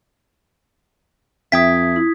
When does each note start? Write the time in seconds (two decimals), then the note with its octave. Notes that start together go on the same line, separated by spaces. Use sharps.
1.52 F2 E5 G5 D#6 G#6 B6
1.96 E4